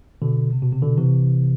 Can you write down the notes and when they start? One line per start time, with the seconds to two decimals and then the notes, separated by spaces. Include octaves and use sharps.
0.22 B2 D3
0.53 C3
0.62 B2
0.72 C3
0.82 B2 D3
0.98 C3 E3